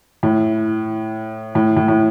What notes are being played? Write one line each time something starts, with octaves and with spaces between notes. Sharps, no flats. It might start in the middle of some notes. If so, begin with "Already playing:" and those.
A2
A2
A2
A2